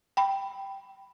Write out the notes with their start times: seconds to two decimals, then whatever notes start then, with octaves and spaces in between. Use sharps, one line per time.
0.17 G5 B5